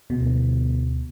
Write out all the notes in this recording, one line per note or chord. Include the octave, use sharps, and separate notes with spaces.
D2 B2